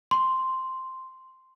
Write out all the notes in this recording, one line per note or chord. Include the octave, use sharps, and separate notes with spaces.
C6